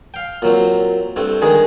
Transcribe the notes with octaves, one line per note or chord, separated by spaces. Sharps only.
F5 G5
A#2 F#3 C4
G2 A3 C4
G2 D#3 G#3 G#4 D#5